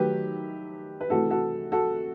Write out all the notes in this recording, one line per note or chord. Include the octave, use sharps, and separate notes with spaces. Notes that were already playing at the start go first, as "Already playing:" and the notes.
Already playing: D#3 F#3 A3 G4 B4
B4
C3 E3 A3 F#4 A4
F#4 A4
F#4 A4